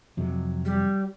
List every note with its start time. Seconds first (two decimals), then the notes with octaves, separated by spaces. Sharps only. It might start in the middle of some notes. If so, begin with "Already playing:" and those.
0.17 F2 C3 F#3
0.65 G3